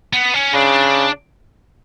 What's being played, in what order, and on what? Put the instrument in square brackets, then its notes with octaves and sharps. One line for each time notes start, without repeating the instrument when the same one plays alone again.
[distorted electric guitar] B3
C#4
[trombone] C#3 [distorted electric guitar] D4